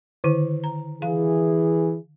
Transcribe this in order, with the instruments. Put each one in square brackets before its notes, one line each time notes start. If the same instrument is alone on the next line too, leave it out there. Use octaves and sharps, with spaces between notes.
[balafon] D3 D#3 E4
A#5
[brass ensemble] E3 G#4 [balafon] F5